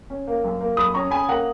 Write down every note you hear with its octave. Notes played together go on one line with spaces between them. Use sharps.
C#4
A#3
F#2
A#3
F#2 B5 D#6
C#4 A#5 C#6
C#4 G#5 B5
A#3 F#5 A#5